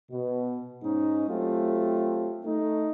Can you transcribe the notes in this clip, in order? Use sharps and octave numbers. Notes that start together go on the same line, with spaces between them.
B2
G#2 C#4 D#4
F#3 A3 C4 F4 G4
A3 D#4